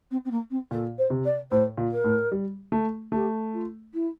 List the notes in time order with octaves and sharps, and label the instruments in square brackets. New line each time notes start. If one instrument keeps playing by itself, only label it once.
[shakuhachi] C4
C4
A#3
C4
[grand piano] A#2 [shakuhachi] A4
[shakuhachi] C5
[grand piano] C3
[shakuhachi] D5
[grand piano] A2 [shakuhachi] C5
[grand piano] A#2
[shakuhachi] A#4
[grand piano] A2
G3
A3
[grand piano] A3 [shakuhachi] G4
[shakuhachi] F4
E4